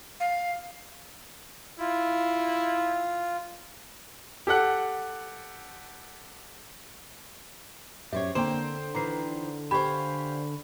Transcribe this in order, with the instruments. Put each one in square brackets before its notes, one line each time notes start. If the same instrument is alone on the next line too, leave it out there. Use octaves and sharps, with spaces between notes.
[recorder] F5
[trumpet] E4 [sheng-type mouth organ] F4
[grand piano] G4 A4 F#5 F#6
[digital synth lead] F#2 [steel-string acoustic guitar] G4 C5 C#5 [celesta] E5
[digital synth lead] D3 [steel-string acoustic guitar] A#3 C4 [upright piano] C5 G5 [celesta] E7
[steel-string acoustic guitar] D#3 E3 [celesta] A#5 C7
[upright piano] G4 [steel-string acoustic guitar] C5 F5 G#5 [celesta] B5 C#6